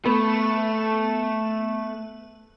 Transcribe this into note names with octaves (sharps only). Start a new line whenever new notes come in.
A3 B3